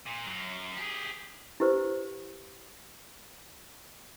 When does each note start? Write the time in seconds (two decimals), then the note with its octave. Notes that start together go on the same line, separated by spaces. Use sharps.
0.06 A#2
0.26 F#2 F#3
0.77 G4 G#4
1.60 E4 G4 B4 C5